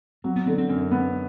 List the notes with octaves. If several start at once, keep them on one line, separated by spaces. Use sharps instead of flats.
F#3 C4
B3
D3 C4
C4
F#2 C4
B3 C4